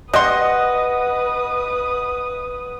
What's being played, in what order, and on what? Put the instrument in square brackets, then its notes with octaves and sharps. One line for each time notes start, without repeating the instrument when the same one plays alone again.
[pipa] G3 C6 [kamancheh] B4 D#6 [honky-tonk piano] D#5 [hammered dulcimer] F#5